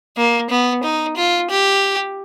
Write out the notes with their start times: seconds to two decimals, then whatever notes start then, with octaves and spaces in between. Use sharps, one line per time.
0.17 A#3
0.50 B3
0.83 D#4
1.16 F4
1.50 G4